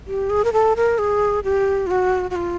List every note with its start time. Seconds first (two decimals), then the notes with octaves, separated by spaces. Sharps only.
0.07 G4
0.30 G#4
0.45 A#4
0.53 A4
0.76 A#4
0.98 G#4
1.44 G4
1.87 F4
1.91 F#4
2.31 F#4
2.36 F4